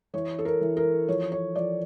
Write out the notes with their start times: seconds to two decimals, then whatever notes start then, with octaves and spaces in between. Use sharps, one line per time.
0.14 E3 C#5
0.39 A4
0.45 A#4
0.61 E3
0.77 A#4
1.08 F3 C#5
1.32 C#5
1.56 F3 D5